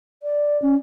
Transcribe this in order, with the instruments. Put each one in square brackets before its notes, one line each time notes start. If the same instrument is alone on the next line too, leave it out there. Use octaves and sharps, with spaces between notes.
[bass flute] D5
C#4